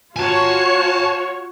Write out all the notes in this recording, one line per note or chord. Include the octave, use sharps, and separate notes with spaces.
F4 F#4 C#5 G#5 A5